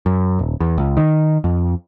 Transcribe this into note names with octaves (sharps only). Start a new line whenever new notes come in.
F#2
D#1
E2
C#2
D#3
F2